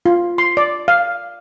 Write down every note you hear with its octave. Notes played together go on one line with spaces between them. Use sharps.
F4
C6
D5
F5